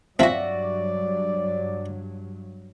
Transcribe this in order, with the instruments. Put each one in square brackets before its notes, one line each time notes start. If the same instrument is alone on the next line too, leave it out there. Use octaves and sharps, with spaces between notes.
[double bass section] G2 F#3 [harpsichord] F3 C4 [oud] F#4 E5 [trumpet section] D5